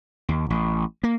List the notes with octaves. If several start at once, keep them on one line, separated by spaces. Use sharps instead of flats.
D#2
A1
A#3